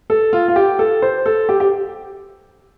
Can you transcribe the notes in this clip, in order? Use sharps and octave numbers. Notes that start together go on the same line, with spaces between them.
A4
F4
F4
G4
A4
C5
A4
G4
G4